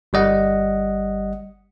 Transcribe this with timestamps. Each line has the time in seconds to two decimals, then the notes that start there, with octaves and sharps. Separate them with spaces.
0.13 G1 G3 D#5 F#5